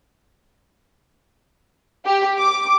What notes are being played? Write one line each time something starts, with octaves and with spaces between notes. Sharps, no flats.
G4
D6